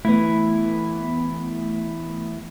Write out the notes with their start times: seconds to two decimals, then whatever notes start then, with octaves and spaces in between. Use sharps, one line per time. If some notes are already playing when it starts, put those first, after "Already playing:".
0.05 E3 A3 B3 E4